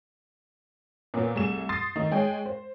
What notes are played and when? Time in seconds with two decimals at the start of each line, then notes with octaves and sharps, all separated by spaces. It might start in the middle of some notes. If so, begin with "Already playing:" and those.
1.14 A#2 A#3 B3 C#4
1.35 C2 A3 G#4 E7
1.69 C6 D#6 A6 C7
1.96 D#3 A3 D#4
2.11 G#3 G#4 C#5 G5
2.46 C5